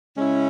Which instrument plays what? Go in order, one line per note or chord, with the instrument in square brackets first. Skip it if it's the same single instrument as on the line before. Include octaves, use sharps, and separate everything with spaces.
[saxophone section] C#3 G#3 C#4 E4